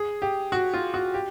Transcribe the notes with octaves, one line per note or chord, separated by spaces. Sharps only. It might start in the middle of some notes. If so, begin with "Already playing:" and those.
Already playing: G#4
G4
F#4
F4
F#4
G4